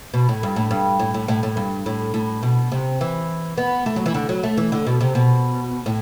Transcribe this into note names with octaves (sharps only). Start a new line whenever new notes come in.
B2
A2
G2
A2
G2
A2
A2
A2
A2
G2
A2
A2
B2
C3
E3
B3
A3
F#3
E3
D3
F#3
A3
E3
D3
B2
C3
B2
A2